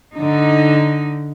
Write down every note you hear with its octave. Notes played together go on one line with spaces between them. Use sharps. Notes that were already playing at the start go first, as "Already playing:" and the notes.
D3 D#4